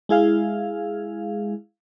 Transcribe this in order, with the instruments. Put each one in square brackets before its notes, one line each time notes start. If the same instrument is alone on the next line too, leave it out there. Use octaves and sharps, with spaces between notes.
[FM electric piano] G#3 E4 G#4 F5